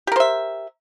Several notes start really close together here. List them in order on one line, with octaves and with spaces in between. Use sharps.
G4 A#4 C5 E5